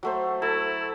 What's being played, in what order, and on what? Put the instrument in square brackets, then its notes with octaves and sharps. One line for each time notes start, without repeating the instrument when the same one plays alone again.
[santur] F#3 A3 C5
[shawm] E4 [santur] A4